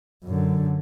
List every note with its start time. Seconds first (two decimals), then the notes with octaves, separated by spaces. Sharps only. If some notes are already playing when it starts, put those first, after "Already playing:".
0.25 F#2 D3